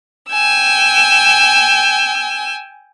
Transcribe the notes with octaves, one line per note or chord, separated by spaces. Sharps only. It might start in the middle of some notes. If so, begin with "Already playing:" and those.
G5 G#5 E6